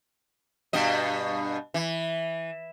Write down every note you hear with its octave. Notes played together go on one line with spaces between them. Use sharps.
G2 B2 D#5
E3